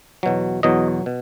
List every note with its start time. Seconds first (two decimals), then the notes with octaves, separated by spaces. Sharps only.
0.23 E2 B2 F#3
0.63 E2 B2 F#3 D#5
1.06 B2